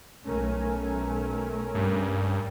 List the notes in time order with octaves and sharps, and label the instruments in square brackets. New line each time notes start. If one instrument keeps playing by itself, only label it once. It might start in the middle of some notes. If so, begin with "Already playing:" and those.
[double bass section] B1 A3 [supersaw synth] C#4 A#4 G#5
[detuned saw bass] G2